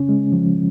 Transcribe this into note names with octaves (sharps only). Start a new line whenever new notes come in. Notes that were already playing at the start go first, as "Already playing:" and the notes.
Already playing: C#3 C#4
G#3
F3